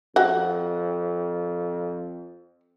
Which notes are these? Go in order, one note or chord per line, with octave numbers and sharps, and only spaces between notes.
F2 F#4 F#5